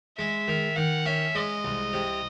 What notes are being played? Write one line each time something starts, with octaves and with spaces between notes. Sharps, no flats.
G#3 E5
D#3
D#3 F#5
C#4 E5
G#3 D#5
C2
C3